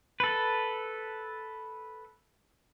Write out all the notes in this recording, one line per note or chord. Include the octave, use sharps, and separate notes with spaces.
A4 B4